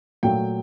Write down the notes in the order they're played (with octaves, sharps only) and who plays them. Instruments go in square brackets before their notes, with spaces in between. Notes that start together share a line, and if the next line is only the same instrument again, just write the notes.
[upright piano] A#2 F#3 A3 G5